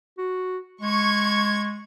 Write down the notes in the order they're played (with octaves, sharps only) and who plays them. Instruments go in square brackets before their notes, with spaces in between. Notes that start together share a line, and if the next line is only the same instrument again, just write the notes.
[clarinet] F#4
[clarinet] G#3 [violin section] C#6 G#6